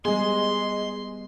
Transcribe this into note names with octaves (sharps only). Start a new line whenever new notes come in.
G3 G#3 B3 G#4 D#5 C6